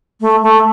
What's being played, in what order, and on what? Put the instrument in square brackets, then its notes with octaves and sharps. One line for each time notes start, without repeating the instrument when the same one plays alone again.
[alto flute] A3
A3